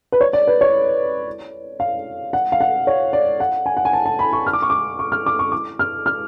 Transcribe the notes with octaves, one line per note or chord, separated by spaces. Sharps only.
B4
C#5
D5
B4
C#5
F5
F#5
F5
F#5
C#5
D5
F#5
G#5
F#5
G#5
A5
A5
B5
C#6
F6
D6
C#6
D6
C#6
F6
D6
C#6
D6
F6
F6